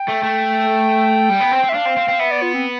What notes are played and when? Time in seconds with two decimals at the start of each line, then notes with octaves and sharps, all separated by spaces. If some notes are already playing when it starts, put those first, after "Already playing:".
Already playing: G5
0.08 A3
0.23 A3
1.30 G3
1.41 B3
1.52 C4
1.64 C4
1.69 E5
1.74 D4 F5
1.86 C4
1.97 C4
2.09 C4
2.20 B3 E5
2.31 D5
2.42 F4
2.54 C4